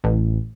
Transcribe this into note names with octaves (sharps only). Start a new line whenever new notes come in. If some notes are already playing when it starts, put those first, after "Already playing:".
A1